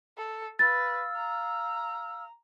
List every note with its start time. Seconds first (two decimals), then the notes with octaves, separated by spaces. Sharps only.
0.17 A4
0.59 B4 F5 E6 F6 A6
1.16 A#5